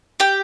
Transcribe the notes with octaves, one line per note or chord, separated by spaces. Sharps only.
G4 G5